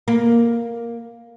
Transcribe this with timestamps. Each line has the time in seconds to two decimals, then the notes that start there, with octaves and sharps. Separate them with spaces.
0.08 A#3